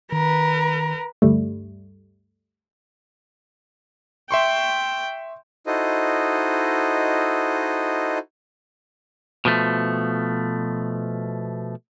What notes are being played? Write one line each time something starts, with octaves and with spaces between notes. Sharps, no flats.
D#3 A#4 B4
D2 G2 G3 A3
E5 G5 C6 C#6
D#4 E4 F#4 A4 C5 D#5
B2 F3 A3